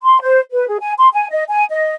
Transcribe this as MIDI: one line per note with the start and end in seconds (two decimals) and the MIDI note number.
0.03 0.18 84
0.21 0.40 72
0.52 0.67 71
0.68 0.78 68
0.80 0.93 80
0.99 1.08 84
1.13 1.27 80
1.31 1.43 75
1.49 1.64 80
1.71 1.94 75